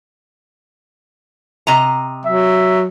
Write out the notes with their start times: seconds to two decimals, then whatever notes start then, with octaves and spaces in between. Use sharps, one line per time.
1.67 C3 D#5 A#5
2.25 F#3 E5